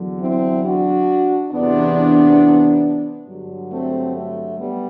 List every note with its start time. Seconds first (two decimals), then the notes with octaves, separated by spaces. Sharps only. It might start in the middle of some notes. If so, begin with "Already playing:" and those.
Already playing: E2 D3 F#3
0.20 C4 E4
0.64 D4 F#4
1.51 E2 C3 E3 B3 D4
3.27 G2 D3 F#3
3.71 A3 C4
4.15 A3
4.59 G3 B3